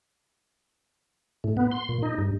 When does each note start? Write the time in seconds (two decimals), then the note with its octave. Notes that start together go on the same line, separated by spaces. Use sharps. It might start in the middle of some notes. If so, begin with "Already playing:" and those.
1.44 A2
1.57 B3
1.71 C6
1.89 A#2
2.02 D#4
2.18 G2